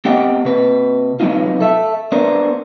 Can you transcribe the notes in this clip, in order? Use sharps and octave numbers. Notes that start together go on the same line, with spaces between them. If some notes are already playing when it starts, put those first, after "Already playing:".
B3 C4 G4 D#5 F#5 G5
C3 B4
C3 F#3 A3 B3 D#4 F4
A4 E5
B3 D4 A#4 C5